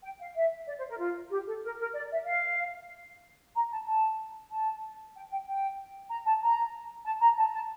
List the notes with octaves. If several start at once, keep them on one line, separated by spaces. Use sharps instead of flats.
G5
F5
E5
D5
C5
A#4
F4
G4
A4
A#4
A#4
D5
E5
F5
A#5
A5
A5
A5
G5
G5
G5
A#5
A5
A#5
A5
A#5
A5
A5